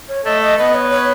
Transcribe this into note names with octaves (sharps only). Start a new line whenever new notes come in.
C#5
A3 A4 D#5
D#5
B3 B4 D#5
C#5
C#5